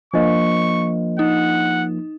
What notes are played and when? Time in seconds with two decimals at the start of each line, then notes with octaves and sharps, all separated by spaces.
0.14 F3 A#3 D4 D#5 C#6
1.19 D#4 F#5